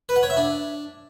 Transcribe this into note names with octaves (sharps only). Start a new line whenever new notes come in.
B4
F#5
C#5
E5
D4